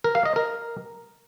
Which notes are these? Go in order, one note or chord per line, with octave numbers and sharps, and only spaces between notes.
A#4
F5
D#5
A#4